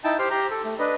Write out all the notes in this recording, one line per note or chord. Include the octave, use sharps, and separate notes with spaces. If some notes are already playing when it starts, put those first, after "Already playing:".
D#4 E4 G5 A5
G4 C5 G5 C6 F6
G4 A#5 G6
A4
A3
D4 B4 D#5